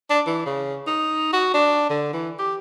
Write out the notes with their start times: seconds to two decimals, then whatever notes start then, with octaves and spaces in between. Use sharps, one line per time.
0.10 D4
0.26 E3
0.46 C#3
0.87 D#4
1.33 F#4
1.54 D4
1.90 D3
2.13 E3
2.39 G4